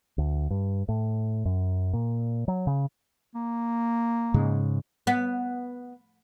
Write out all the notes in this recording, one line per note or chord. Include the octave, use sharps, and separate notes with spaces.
D2
G2
A2
F#2
A#2
F#3
C#3
A#3
G#2 C#3 G#3
B3